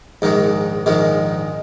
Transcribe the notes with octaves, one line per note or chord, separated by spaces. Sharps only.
A#1 G#2 D#3 G#3
A#1 G#2 D#3 G#3